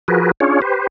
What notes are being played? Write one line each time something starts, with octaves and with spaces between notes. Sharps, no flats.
F3 F#4 G#4 A#4 B4
C#4 D4 F4 G#4 C#5
G4 B4 C5